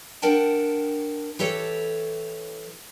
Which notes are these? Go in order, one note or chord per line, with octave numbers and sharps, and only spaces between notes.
D4 A#4 F#5 G5 A5
E3 G4 A4 C#5